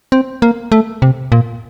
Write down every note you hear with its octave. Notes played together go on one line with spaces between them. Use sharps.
C4
A#3
A3
C3
A#2